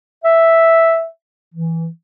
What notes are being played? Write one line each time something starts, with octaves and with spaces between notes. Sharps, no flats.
E5
E3